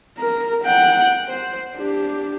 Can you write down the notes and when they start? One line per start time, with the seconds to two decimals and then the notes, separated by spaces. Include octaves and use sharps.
0.18 A#4
0.64 F#5 G5
1.28 C5
1.76 D4 G4